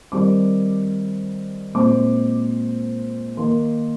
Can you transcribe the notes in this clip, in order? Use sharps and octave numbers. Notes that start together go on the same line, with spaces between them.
D#3 G3 C4 D6
A#2 G#3 C4 D6
D#3 A#3 C6